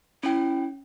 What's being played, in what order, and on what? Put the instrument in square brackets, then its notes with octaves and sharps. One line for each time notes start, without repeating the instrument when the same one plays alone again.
[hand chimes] C#4 G5 [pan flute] E4